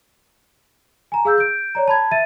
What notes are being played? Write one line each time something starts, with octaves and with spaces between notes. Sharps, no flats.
G#5 A#5
G#4 F5 E6 G6
G6 D7
C#5 D5 A#5
A5 B5 G#6
E5 A6 D#7